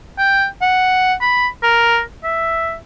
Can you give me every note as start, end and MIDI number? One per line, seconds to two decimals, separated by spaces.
0.18 0.46 79
0.61 1.14 78
1.21 1.48 83
1.63 2.01 70
2.24 2.75 76